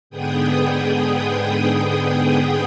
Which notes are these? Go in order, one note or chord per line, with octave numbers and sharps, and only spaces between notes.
G#2 D3 B3 G#4 G5 D#6